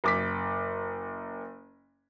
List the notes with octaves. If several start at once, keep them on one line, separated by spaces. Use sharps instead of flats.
F#1 D6 B6